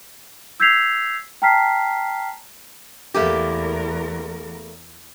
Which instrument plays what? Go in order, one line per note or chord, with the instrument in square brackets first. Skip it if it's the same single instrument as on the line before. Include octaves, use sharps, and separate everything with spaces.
[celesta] E6 G6 G#6 B6 C7 F7
G5 A5 A#5 F6 B6 C7
[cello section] E2 A#4 [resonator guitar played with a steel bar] A3 A#3 G4